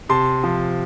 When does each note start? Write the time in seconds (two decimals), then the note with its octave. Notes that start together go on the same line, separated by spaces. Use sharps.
0.09 C3 A5 C6
0.44 F3